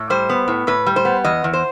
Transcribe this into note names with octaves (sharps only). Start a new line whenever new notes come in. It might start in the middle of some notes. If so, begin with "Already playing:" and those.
Already playing: A2
G3 C5
B3
A2
A2 B4
G3
C5
B3
E2 D#5
E2
C5